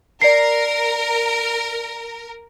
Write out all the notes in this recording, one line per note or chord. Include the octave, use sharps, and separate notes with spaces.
A#4 D5 C7